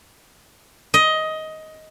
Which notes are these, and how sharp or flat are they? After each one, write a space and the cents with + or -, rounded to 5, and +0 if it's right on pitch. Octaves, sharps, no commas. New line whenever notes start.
D#5 +15